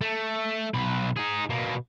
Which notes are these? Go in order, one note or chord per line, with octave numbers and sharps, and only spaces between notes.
A3
B1 B4
D#4 G#4
B2 A#3